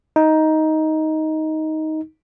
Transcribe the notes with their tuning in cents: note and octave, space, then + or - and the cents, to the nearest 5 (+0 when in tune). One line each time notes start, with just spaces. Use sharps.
D#4 +10